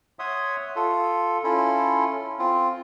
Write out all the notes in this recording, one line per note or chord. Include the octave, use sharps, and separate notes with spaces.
C#5 E5 F#5 C6 D#6
F4 A4
C#4 E4 F4 A4
C4 F4